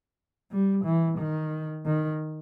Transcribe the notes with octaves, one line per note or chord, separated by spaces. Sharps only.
G3
E3
D#3
D#3